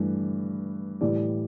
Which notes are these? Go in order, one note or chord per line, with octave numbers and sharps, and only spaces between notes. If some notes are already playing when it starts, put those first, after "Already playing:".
Already playing: G2 E3 A3
A2 E3 G3 D5